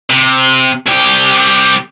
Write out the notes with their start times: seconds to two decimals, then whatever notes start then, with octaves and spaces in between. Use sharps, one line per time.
0.10 C3
0.86 C2 G4